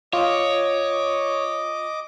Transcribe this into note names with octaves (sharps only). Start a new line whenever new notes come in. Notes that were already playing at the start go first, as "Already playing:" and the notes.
F4 C#5 D#5 D6